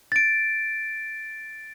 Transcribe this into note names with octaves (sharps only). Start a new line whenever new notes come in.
A6 D7